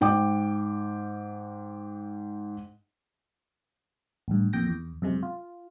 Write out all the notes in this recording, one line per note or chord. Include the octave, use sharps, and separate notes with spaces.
G#2 G5 D6
A1 G2
F2 A#2 G5 A#6
E2
F#2 C3 G#3
F4